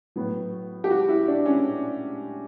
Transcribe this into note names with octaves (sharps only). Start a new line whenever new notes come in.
A2 F#3 B3
G4
F#4
E4
D4
C#4